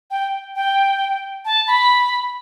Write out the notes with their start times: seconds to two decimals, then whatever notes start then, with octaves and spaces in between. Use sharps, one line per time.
0.11 G5
0.55 G5
1.45 A5
1.67 B5